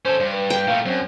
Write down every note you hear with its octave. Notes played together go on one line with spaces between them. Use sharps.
C#4 A4 C5
G2
B4
G5
A#2 A3 F5
F#2 C4